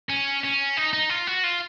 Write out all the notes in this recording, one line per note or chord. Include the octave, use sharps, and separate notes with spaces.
C#4
C#4
D#4
D#4
F4
F#4
F4